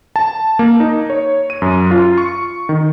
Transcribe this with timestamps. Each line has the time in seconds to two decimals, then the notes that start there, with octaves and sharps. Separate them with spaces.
0.16 A5
0.59 A#3
0.80 D#4
1.10 C#5
1.50 D#7
1.62 F#2
1.91 F4
2.18 C#6
2.69 D#3